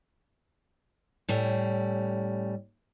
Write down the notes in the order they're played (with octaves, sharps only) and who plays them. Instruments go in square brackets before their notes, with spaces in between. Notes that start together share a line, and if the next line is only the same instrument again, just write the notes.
[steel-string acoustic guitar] A2 G3 C#4